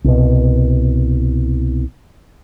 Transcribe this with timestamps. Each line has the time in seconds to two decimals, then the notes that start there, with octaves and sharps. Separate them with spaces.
0.04 C2 B2